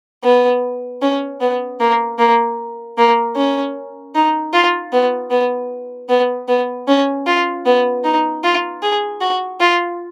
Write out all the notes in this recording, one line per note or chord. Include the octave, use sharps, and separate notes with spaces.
B3
C#4
B3
A#3
A#3
A#3
C#4
D#4
F4
B3
B3
B3
B3
C#4
F4
B3
D#4
F4
G#4
F#4
F4